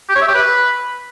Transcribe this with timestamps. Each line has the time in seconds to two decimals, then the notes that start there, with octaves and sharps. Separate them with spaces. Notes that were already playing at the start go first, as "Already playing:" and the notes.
0.09 G4
0.15 C#5
0.22 E5
0.28 G4
0.34 B4